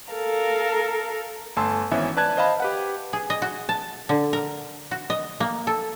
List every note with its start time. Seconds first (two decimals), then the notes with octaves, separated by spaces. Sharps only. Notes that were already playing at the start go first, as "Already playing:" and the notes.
0.12 A4 A#4 F5
1.56 G1 A3 G#5 A5 C6 E6
1.91 G#1 E3 B3 C#4 E5
2.17 B4 D5 A5 F#6 G#6
2.37 C5 D#5 F5 A5 B5
2.60 G4 B4 F#5
3.13 G#4
3.30 D#5
3.42 F#4
3.69 A5
4.09 D3
4.33 A#4
4.91 F#4
5.10 D#5
5.40 A#3
5.67 A4